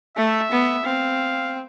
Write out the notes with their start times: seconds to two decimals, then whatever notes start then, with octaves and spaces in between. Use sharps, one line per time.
0.17 A3 E5
0.52 B3
0.85 C4 F5